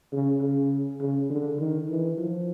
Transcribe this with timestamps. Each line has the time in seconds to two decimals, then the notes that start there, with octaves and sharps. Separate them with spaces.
0.13 C#3
0.41 C#3
1.00 C#3
1.30 D3
1.60 D#3
1.89 E3
2.18 F3